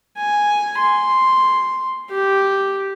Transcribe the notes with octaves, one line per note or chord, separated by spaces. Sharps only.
G#5
C6
G4